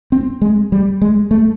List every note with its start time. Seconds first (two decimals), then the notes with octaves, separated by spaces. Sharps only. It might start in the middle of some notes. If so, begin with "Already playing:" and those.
0.12 C4
0.42 G#3
0.72 G3
1.02 G#3
1.31 A3